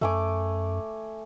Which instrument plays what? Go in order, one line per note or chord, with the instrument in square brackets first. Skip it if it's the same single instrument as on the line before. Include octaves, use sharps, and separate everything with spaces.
[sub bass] F#2 [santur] A3 G#5 D6